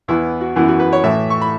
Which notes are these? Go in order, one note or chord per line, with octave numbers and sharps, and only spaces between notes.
E2 E3 B3 E4
F#4
F#2 E3 B3 E4
F#4
B4
C#5
A2 E3 A3 E5
C#6
B5